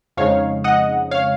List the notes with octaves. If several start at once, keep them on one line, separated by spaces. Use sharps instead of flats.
F2 C#3 G#3 D#4 C#5 F5
D#5 F#5
C#5 F5